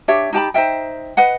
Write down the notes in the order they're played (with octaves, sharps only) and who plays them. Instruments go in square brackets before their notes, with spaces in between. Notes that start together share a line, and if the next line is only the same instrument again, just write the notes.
[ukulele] D4 G4 C#5 E5
D#4 G4 A5 B5
D#4 C5 E5 G5
B4 D#5 F#5